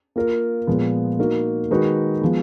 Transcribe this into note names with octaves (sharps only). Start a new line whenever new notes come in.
A#3 F4 A#4
A#2 F3 G#3 B3
A#3 D#4 F#4 A#4
D#3 G#3 D#4 F#4 B4
F3 G#3 B3